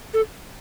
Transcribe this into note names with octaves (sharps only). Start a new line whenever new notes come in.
A4